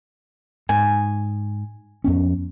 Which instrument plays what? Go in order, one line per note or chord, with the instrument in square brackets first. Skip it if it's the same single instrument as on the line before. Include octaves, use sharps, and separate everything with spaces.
[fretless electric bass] G#2 [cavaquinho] G#5
[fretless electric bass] F2 B3 C#4